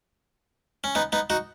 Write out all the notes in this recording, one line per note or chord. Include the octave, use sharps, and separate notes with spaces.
C#4
B3 D#4
B3 D#4
D#4 F#4